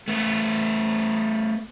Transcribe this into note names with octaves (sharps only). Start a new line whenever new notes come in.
A3 B3